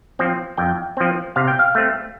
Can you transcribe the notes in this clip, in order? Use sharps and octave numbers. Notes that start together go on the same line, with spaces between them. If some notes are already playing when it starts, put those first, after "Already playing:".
F3 C4
F2 G5
F3 C4
C3 F5
G5
F5
A3 C4